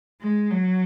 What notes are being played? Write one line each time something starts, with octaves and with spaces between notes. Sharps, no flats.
G#3
F#3